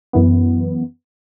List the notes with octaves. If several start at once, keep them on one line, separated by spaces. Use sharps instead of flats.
F#2 E3 B3